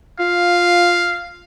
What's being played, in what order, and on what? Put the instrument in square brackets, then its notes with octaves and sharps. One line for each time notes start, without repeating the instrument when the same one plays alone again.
[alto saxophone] F4 [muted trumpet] F5